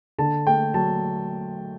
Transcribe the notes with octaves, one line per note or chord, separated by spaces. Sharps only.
D3 A5
A3 G5
F#3 A5